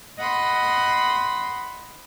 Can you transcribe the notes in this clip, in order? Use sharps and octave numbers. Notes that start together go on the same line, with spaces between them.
D#5 F#5 B5 C6